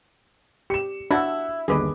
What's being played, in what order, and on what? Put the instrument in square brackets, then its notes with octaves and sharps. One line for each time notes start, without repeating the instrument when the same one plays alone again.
[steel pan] G4 [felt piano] C#7 E7
[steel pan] D4 F#4 A5 [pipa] E4 [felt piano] F#5 E6
[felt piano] G1 D#2 D6 [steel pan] G#4 B4 D#5